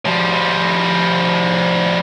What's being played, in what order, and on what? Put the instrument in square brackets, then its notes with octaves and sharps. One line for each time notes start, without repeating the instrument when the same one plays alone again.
[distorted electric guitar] F3 G3